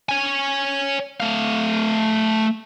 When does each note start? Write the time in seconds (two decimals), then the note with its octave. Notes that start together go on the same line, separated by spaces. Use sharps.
0.09 C#5 G#5
1.20 A3 F5